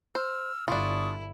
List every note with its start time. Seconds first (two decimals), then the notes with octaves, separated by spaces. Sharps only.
0.15 C5 E6 F6
0.68 G1 D4 E4 F4 C#6 D#6